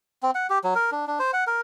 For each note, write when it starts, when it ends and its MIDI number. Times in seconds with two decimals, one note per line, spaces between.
0.23 0.31 60
0.35 0.47 78
0.50 0.58 67
0.64 0.74 54
0.75 0.90 70
0.92 1.05 62
1.07 1.18 62
1.19 1.31 72
1.33 1.44 78
1.47 1.61 70